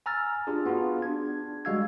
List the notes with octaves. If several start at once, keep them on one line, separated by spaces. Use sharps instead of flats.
G#5 A#5 E6 F6 A6
D4 F4 G4 G#4
B3 F4 F#4 G#4
D4 G#6
G3 G#3 F#4 F5 E6 G#6